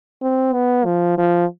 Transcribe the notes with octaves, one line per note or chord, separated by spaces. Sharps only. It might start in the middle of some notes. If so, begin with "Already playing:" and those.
C4
B3
F3
F3